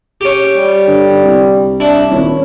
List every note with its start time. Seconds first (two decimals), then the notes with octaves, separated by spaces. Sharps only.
0.21 C#4 G4
0.56 G3
0.87 D3
1.24 C2
1.80 D4 E4
2.11 D#1 C#5